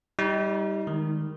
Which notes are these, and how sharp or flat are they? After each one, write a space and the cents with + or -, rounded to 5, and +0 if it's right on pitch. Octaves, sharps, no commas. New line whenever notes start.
G3 +0 D#4 +35
D#3 +0 G#3 +5